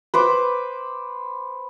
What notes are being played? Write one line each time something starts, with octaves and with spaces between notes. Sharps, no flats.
B4 C5 D6